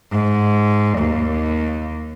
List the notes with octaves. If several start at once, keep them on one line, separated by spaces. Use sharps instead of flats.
G#2
D#2